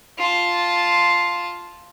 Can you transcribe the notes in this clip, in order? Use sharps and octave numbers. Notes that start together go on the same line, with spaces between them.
F4 A5